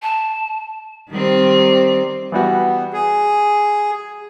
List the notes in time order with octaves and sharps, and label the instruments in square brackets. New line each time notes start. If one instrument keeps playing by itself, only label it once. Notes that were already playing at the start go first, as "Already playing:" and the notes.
[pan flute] A5
[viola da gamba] D#3 G3 C4
[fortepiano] E3 G3 F#4 [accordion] B3
[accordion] G#4